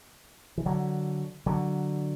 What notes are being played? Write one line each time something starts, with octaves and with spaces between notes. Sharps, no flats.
E3
D3 F#3
D3 F#3